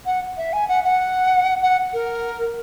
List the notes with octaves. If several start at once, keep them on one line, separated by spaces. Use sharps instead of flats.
F#5
E5
G#5
F#5
F#5
F#5
A#4